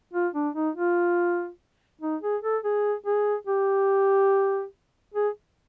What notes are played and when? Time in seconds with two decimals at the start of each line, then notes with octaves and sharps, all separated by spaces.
0.13 F4
0.35 D4
0.55 D#4
0.76 F4
2.01 D#4
2.22 G#4
2.43 A4
2.64 G#4
3.06 G#4
3.47 G4
5.14 G#4